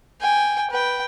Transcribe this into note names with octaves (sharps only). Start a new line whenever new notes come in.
G5 G#5
B4 G5